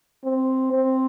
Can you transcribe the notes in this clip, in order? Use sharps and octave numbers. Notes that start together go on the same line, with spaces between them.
C4
C4